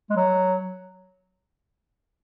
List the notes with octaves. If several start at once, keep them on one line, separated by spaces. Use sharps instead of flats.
G#3
F#3